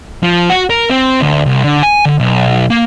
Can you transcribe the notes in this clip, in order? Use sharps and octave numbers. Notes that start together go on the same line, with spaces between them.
F3
F#4
A#4
C4
D2
C2
D3
G#5
D3
B1
A#3